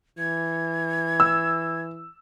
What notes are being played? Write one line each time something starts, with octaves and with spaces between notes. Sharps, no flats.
E3 G#6
E6